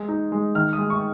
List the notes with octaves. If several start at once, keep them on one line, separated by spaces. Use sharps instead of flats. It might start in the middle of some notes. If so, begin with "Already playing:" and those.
Already playing: G#3
D#4
G#3
D#3 F6
D#6
G#3
C#6